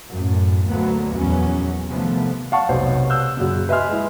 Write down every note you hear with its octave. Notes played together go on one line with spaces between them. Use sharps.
F#2 A2
D2 F#3 A#3 B3
A#1 E2 F#3 B3 C#4
C3 D#3 F3 A3 B3
F5 F#5 A5 C#6
F1 B1 B3 C5 C#5 F#5
E6 F#6 G6
F#2 A#2 C#3
B4 D#5 E5 G#5 C6 F6
G#3 E4